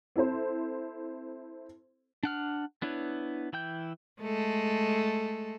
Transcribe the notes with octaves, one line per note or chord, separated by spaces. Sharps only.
C4 E4 A4 C5
D4 F#5 F6
B3 D4 E4 B4 C#5
E3 E4 G5 G6
G#3 A3 A4